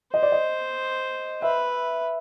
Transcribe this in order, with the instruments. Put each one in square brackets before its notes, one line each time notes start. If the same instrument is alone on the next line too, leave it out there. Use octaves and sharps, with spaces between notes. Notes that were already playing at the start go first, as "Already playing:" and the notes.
[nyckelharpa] C5 [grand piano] D#5
[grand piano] D5
D#5
[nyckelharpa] B4 [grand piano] E5